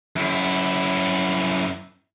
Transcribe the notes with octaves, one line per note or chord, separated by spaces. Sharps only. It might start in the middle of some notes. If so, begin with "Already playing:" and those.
F#2 E4